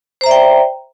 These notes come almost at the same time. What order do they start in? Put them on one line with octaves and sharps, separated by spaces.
C5 A#5 E5 D5 G5